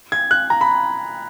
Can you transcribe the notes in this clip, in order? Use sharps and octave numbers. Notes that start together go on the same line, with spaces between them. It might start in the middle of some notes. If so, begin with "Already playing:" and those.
G#6
F#6
A#5
B5